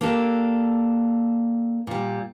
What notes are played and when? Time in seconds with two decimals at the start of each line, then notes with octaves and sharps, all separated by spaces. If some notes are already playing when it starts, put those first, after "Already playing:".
0.01 A#3 D4 G4 A4
1.87 A#2 G3